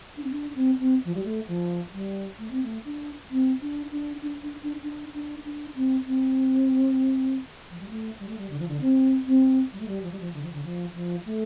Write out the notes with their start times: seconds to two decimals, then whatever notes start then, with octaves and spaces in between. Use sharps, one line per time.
0.17 D4
0.24 C4
0.31 D4
0.55 C4
0.79 C4
1.05 F3
1.15 G3
1.24 A3
1.48 F3
1.93 G3
2.39 A3
2.51 C4
2.64 A3
2.85 D4
3.31 C4
3.61 D4
3.91 D4
4.22 D4
4.43 D4
4.63 D4
4.83 D4
5.14 D4
5.44 D4
5.75 C4
6.06 C4
7.70 F3
7.80 G3
7.89 A3
8.20 G3
8.29 A3
8.38 G3
8.50 D3
8.59 F3
8.68 D3
8.81 C4
9.27 C4
9.73 G3
9.80 A3
9.88 G3
10.03 F3
10.12 G3
10.20 F3
10.33 D3
10.43 F3
10.53 D3
10.64 F3
10.95 F3
11.26 A3